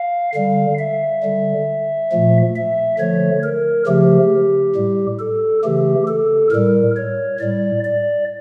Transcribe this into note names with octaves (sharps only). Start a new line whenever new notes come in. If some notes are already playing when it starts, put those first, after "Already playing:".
Already playing: F5
D3 G3 F5
E5
D3 G3
A#2 F3 A3
E5
D3 F3 A3 C#5
A#4
C#3 F3 A3 G4
A2 G3
A4
C#3 E3 A3 G4
A4
A2 G3 A#4
C#5
A2 G3 D5
D5